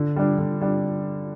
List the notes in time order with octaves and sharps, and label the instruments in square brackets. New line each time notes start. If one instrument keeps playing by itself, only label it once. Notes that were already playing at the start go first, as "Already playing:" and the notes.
Already playing: [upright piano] D3
G3 D4
D3
G3 D4